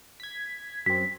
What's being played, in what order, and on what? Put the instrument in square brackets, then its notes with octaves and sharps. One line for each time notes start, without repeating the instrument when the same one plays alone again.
[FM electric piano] G#6 B6
[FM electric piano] F#2 C4 [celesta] B6